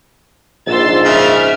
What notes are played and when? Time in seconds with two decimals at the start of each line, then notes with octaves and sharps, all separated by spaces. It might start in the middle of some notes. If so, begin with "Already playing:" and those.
0.67 A#1 G#2 C6 E6 A6
1.05 C#3 E5 F6